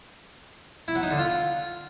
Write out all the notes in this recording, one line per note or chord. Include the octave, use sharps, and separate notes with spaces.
E4
F#3
D#4
D3
F4